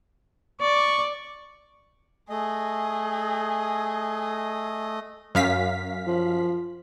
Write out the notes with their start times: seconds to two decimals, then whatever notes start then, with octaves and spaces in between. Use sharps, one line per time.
0.61 D5 C#6
2.30 A3 G#4 D#5
5.35 F#2 F5 B6
6.07 F3